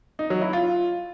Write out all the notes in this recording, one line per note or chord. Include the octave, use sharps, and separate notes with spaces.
D#4
F#3
E4
F4